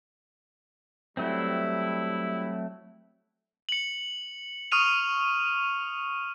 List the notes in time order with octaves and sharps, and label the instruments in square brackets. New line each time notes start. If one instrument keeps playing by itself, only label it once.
[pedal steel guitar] F#3 A3 C4 [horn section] G3 E4
[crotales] C#7 F#7
C#6 D#6 F6 D#7 F7